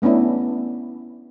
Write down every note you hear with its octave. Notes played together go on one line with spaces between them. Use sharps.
A3 B3 C#4 D4 E4